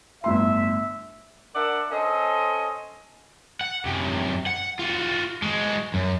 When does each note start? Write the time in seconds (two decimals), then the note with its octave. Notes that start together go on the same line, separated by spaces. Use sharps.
0.24 G1 A2 E5 C6
1.55 D4 A#4 D5 E5 F#5
1.91 C#4 A4 C5 D#5
3.61 F#5
3.85 F#2 C3
4.47 F#5
4.79 F4 F#4
5.42 G#3 F#4
5.94 F#2